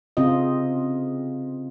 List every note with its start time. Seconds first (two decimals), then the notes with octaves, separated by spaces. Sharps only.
0.17 C#3 C4 F4 D#5